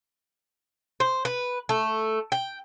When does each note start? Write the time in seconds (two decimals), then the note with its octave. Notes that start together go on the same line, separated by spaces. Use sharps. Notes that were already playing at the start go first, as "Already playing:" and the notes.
1.00 C5
1.25 B4
1.69 A3
2.32 G5